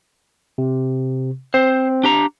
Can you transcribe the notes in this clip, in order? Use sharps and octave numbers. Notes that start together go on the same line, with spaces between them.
C3
C4 C5
D4 G4 A#5